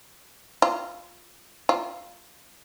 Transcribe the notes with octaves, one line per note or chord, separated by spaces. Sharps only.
F4
F4